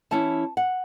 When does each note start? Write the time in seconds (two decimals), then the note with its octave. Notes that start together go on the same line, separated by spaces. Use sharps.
0.11 E3 C#4 E4 A5
0.57 F#5